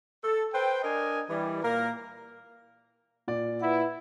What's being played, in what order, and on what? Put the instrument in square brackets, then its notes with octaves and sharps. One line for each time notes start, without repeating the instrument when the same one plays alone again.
[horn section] A4
B4 C5 G5
D4 A#4 D#5 G#5
E3 G3
A#2 A#3 A#4
[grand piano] A#2 D5
[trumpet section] E4 [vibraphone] B4 F#5